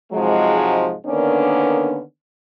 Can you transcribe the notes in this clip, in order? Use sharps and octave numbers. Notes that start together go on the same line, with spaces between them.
G#2 C3 F3 F#3 G#3
D3 D#3 A#3 B3 C#4 D4